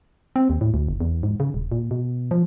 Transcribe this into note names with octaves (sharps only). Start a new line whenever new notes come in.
C4
D#2
A2
D2
F#1
E2
G#2
C#3
D#1
A#2
B2
F3